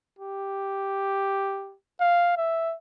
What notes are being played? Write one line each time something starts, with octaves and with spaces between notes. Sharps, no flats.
G4
F5
E5